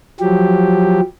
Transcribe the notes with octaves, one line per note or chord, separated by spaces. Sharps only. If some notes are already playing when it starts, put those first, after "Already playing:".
F3 F#3 G4